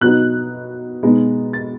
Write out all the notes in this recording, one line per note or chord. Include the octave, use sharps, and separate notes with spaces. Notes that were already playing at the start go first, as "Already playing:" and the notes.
B2 F#3 B3 D#4 F#6
B2 G#3 B3 D#4
A6